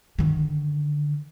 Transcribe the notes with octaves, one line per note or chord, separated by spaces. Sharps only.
D3 D#3